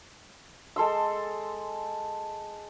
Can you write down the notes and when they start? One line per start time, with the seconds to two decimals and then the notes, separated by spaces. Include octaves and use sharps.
0.76 G#3 A4 C6 E6